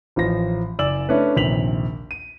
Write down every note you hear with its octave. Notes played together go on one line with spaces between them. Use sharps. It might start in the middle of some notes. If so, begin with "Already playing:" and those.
A1 F3 A#6
F#1 D5 G#5 E6 F#7
A3 C#4 D4 E4 B4
A#1 D#2 C3 B6 F7 F#7
D#7